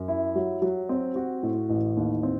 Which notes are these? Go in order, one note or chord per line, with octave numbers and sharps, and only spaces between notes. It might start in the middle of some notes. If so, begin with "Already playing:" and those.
Already playing: F#2
E4
F#3
F#3
C4
F#4
A2
A1
D#2
C4